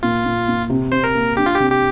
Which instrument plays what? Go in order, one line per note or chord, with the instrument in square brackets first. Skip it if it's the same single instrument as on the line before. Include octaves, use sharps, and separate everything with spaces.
[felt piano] A#2 [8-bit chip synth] F4
[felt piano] A#2
A#2
C3
[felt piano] C3 [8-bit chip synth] C5
[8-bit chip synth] A#4
[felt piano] A#3
[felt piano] D4 [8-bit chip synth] G4
[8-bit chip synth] F4
[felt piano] C3 [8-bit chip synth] G4
[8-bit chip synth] G4